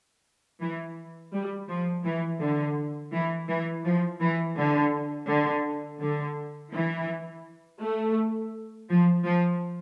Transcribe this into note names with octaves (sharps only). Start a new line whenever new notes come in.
E3
G3
F3
E3
D3
E3
E3
F3
E3
D3
D3
D3
E3
A3
F3
F3